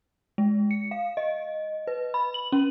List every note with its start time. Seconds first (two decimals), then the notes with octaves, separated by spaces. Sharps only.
0.38 G#3
0.71 C#7
0.91 F5
1.17 D#5
1.87 B4
2.14 B5
2.34 F#7
2.52 C#4